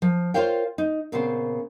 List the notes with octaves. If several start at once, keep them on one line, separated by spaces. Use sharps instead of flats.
F3
F4 A#4 C5 C#5 F5 G5
D#4
A#2 C#3 B3 C4 C5